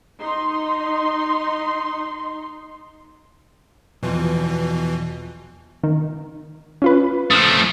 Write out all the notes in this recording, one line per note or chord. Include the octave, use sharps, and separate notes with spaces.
D#4 C6
E2 B2 E3 F3
D#3
C#4 F4 B4
F3 A3 D#6 F6